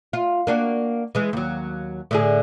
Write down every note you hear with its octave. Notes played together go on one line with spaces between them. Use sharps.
F4
A#3 D4 F#4
E3 G#3
D#2 F#3
A2 D3 G#4